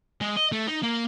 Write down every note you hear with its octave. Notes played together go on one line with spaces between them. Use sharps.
G#3
D#5
A3
D#4
A#3